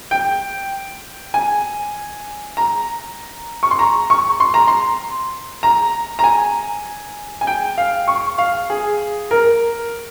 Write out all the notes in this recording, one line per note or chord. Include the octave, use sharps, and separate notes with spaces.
G5
G#5
A#5
C#6
C6
A#5
C#6
C6
A#5
C6
A#5
A#5
G#5
G#5
G5
F5
C#6
F5
G#4
A#4